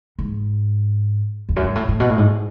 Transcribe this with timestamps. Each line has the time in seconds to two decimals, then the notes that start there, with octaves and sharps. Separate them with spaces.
0.19 G#2
1.49 E2
1.56 F#2
1.64 G#2
1.75 A2
1.88 A2
2.00 B2
2.10 A2
2.18 G#2